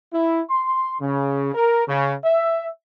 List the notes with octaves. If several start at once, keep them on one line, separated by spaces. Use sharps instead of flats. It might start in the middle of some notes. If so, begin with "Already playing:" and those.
E4
C6
C#3
A#4
C#3
E5